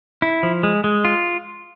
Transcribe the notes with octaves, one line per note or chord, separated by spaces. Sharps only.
E4
F3
G#3
G#3
F4